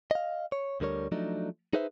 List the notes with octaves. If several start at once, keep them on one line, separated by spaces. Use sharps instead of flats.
D#5 F5
C#5
D2 D3 G3 A#4 C#5
F3 F#3 A3 D4 D#4
D#4 G#4 B4 C5 E5